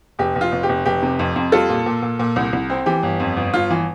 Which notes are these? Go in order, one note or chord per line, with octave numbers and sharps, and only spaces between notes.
F1 G4
F1
F4
F1
G4
F1
F1 G4
C3
F2
F2
G3 F4 A4
A#2
A#2
A#2
A#2
C2
C2
C4
E3 G4
G1
F2
G1
G1 F4
E3